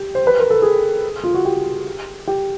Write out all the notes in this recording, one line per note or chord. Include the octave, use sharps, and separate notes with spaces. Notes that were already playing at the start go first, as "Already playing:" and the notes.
Already playing: G4
C5
B4
A#4
A4
G#4
F4
F#4
G4
G4